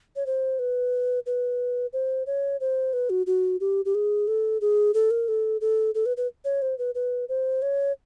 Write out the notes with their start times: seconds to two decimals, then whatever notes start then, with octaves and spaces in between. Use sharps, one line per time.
0.16 C#5
0.26 C5
0.59 B4
1.26 B4
1.93 C5
2.27 C#5
2.60 C5
2.93 B4
3.10 F#4
3.27 F#4
3.60 G4
3.85 G4
3.95 G#4
4.28 A4
4.61 G#4
4.94 A4
5.11 A#4
5.28 A4
5.61 A4
5.95 A4
6.06 B4
6.17 B4
6.45 C#5
6.62 C5
6.78 B4
6.95 B4
7.29 C5
7.62 C#5